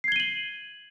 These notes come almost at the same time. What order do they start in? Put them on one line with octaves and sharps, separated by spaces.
C7 G#6 G7 D#7 F#7